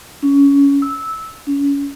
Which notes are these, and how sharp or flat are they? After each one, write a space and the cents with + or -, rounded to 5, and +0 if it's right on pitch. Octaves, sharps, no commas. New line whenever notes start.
C#4 +20
E6 -15
C#4 +30